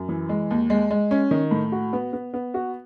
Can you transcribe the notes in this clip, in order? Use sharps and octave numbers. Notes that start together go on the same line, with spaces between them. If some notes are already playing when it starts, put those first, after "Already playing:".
Already playing: F#2
E3
G#3
D#2
G#3
G#3
C#4
D#3
A2
F#4
B3
B3
B3
F#4